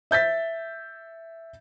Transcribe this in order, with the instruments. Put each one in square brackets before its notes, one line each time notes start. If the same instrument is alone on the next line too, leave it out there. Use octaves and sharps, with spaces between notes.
[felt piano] E5 G6 A6 B6